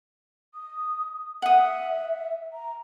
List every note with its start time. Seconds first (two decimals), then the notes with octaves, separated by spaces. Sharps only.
0.54 D#6
1.42 E5 F#5 D#6
2.53 A#5